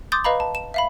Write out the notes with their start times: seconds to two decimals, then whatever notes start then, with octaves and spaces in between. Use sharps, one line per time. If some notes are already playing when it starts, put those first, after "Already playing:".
0.12 C6 D6 D#6 G6 A6
0.24 B4 D#5 F5 A#5 B5
0.40 A5
0.55 E7
0.74 E5 F5 B5